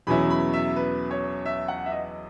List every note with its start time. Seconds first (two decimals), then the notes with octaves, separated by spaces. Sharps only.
0.07 E2 B2 F#3 C#4 E4 B5
0.30 B5
0.53 E5
0.76 B4
1.11 C#5
1.46 E5
1.68 F#5
1.86 E5
1.92 D#5